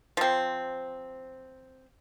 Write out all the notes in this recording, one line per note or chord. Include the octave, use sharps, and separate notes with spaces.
F3 C4